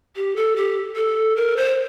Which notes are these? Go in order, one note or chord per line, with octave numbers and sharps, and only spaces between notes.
G4
A4
G4
A4
A#4
C5